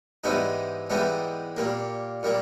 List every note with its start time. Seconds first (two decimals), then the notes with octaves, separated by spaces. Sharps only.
0.24 G#2 E3 G3 B3 D#4
0.90 G#2 E3 G3 B3 D#4
1.57 A#2 G3 A#3
2.23 A#2 G3 A#3